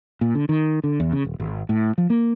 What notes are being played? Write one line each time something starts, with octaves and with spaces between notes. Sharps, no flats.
A#2
D3
D#3
D3
E2
C#3
D#1
G#1
A2
F3
A#3